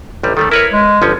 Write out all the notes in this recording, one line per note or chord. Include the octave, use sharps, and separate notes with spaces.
A1 C3 G3
D#3 G3 A3 A4
E4 A#4 B4 C#5
G#3
G1 F3 C#4